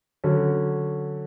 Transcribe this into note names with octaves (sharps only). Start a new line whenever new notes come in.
D3 F#3 C#4